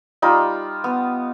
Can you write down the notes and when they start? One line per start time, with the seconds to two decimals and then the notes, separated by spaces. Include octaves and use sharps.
0.22 G3 D#4 F4 B5
0.84 B3